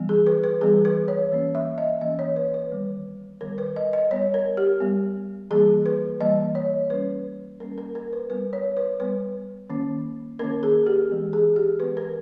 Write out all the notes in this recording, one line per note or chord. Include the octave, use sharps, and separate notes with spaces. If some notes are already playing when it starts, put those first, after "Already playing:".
Already playing: E3 G3 B3
G#4
B4
B4
E3 G3 B3 G#4
B4
C#5
E3 A#3 C#4
E5
D#5
E3 A#3 C#4 D#5
C#5
B4
B4
D#3 G3 B3
D#3 G3 B3 A#4
B4
D#5
D#5
G3 B3 C#5
A#4
G4
G3 B3
E3 G3 A#3 G#4
B4
E3 G3 A#3 D#5
C#5
G3 A#3 C#4 B4
G3 A#3 C#4 A#4
A#4
A#4
B4
G3 B3 B4
C#5
B4
G3 B3 B4
D#3 A#3 C#4
D#3 A#3 C#4 A#4
G#4
G4
E3 G#3 B3
G#4
G4
E3 G#3 B3 B4
A#4